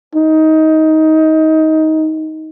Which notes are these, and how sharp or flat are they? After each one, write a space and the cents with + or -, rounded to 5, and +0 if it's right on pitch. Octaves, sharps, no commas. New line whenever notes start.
D#4 +20